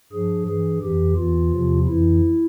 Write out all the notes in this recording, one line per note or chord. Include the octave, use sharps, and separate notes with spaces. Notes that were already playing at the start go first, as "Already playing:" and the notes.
G2 F3 G#4
G2 E3 G#4
F2 E3 G4
E2 E3 F4
E2 C3 F3
F2 E3 E4